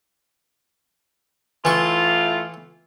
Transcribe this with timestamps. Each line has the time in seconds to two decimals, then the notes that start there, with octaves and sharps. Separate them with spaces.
1.65 A2 E3 A3 F4 C#6